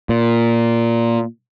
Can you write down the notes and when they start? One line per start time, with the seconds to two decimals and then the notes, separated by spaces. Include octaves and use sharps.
0.09 A#2